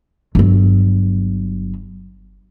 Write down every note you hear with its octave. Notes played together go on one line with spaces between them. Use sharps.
G1 F#3